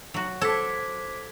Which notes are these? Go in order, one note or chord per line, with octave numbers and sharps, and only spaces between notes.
F#3 F#4
A4 C5 D6 G#6 B6